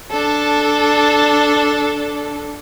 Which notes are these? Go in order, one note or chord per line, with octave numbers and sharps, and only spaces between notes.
D4 A4